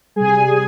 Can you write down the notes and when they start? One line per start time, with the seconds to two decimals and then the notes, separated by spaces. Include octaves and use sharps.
0.16 C3 G3 G#4 G#5